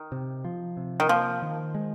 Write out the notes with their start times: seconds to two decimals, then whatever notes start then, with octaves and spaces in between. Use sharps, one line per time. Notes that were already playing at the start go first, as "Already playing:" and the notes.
Already playing: D#3
0.12 C3
0.44 F3
0.77 C3
1.00 D#3
1.09 F3 A#3
1.42 D#3
1.75 G#3